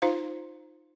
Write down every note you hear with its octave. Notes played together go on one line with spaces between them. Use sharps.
D#4 F4 C5 F5